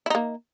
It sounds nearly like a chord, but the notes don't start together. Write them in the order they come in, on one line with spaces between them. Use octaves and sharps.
E4 D#4 A#3